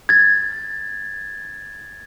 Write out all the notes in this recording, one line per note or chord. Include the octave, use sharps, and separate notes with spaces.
G#6 A6